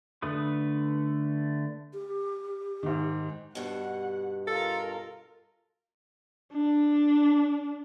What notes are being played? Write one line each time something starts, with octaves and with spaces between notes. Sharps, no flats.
D3 A3 B4 D#6
G4
G#2 D#3
G2 B2 F#5
F4 A4 A#4
D4